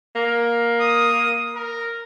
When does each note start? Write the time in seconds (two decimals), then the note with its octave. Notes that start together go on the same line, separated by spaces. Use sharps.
0.16 A#3
0.81 D#6
1.55 A#4